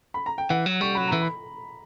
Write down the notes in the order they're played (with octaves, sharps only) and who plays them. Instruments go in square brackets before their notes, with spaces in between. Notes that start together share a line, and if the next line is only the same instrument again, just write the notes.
[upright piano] B5
A#5
G5
[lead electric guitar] E3 [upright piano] F#5
[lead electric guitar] F#3
[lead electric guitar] G3 [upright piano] C#6
[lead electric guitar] F#3 [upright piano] B5
[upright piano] A#5
[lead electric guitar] E3
[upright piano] B5